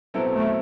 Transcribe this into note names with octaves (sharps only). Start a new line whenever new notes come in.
B2 F#3 C4 E4 A4
A3